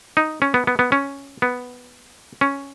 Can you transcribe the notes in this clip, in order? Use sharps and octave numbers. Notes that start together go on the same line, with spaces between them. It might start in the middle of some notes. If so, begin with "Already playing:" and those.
D#4
C#4
B3
B3
B3
C#4
B3
C#4